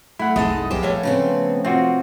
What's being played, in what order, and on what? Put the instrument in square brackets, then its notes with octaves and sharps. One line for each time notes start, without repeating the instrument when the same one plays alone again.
[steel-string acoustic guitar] A3 [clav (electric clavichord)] E4 F#5
[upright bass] F#1 C2 [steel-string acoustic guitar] G#3 [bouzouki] D#4 A4 D#5
[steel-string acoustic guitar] B2 G#3 G4 [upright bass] F3 [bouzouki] C5
[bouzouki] A3 C#5 F5
[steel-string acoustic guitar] C#3 B3 C4
[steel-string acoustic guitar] C3 [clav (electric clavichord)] C4 F4 F#4